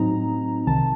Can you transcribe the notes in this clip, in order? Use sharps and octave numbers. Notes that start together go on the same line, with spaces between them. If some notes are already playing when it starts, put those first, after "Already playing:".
Already playing: A2 F#3 C4 D#4 A#5
C2 C3 D#3 A5